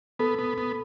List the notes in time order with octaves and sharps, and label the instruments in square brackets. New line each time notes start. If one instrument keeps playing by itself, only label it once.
[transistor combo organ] B3 [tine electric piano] A4
[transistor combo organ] B3
B3